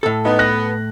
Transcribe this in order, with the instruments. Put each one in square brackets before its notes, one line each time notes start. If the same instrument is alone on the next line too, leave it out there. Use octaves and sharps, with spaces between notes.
[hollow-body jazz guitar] A2 A4
[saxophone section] B3 [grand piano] D#4
[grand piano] F#6 A#6